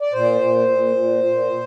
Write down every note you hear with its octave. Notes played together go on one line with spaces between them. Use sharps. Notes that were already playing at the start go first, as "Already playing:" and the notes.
D5
A#2 C5
A#2
A#2
A#2
A#2